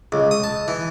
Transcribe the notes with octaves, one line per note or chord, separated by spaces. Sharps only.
C#2
D#6
A5
E3